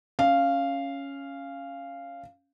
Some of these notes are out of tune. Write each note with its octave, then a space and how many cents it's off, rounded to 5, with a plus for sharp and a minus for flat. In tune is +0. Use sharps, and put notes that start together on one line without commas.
C#4 +0 F5 -10